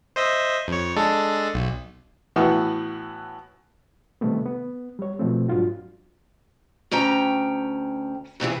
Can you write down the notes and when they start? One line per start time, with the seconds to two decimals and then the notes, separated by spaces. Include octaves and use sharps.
0.16 C5 D#5 E5
0.68 F2 C#5
0.96 G#3 D4 A4
1.54 B1
2.36 A2 E3 B3 F#4 F6
4.21 C3 D#3 G3 A3 B3
4.45 B3
4.99 G3 C#5
5.19 B2 F3 A3 C4
5.49 G#2 F#3 D4 F4 F#4
6.91 D2 C#4 G5 A#5
8.40 G2 C3 E3 G#4